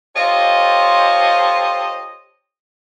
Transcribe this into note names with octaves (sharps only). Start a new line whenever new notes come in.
F4 G4 A4 C5 C#5 D#5